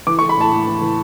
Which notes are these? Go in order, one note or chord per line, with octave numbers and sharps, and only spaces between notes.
E3 D6
C#6
E3
B5
A2 A5
A2
E3
E3